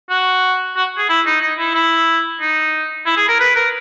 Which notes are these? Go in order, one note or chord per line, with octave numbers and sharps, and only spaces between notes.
F#4
F#4
G#4
E4
D#4
D#4
E4
E4
D#4
E4
G#4
A#4
B4
A#4